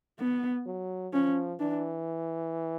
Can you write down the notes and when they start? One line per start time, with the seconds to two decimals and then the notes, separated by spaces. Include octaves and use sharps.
0.20 B3
0.66 F#3
1.13 F3 C#4
1.60 E3 D4